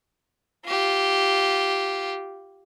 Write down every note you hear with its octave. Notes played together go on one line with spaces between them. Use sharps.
F4 G4